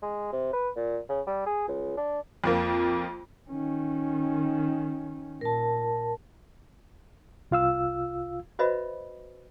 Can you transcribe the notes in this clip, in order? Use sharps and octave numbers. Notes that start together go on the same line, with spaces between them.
G#3
C3
B4
A#2
C#3
G3
G#4
C#2
D4
F2 F3 A#3
D#3 C#4
A#2 A#4 A5
C2 F4 F5 E6
F#4 B4 C5 D#5 E5 B5